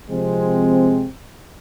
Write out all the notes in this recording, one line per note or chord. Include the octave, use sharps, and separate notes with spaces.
C3 F3 G#3 C4